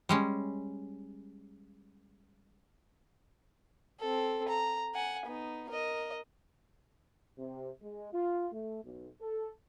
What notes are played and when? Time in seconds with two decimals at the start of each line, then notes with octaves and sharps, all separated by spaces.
0.09 G3 G#3 C#4
4.00 C4 A4
4.48 A#5
4.94 F#5 G#5
5.25 B3 D#4
5.70 A#4 D#5
7.38 C3
7.82 G#3
8.13 F4
8.53 A3
8.84 B1
9.21 A4